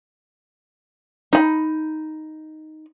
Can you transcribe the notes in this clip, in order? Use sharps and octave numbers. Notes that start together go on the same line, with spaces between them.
D#4 B5